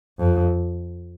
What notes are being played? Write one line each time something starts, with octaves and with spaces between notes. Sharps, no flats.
F2